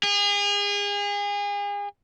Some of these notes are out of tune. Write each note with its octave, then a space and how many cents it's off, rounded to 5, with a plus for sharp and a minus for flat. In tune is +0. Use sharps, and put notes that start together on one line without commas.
G#4 -35